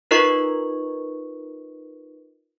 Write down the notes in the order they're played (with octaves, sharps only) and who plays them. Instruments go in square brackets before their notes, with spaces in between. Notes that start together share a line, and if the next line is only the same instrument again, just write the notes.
[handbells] D#4 F4 A#4 B4 D#5 C#6